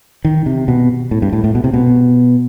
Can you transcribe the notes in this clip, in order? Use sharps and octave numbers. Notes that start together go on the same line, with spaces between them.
D#3
C3
B2
A2
G2
A2
A2
B2
C3
B2